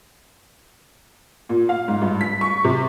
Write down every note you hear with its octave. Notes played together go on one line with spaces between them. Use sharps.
A#2
F5
G#2
G2
B6
C#6
C3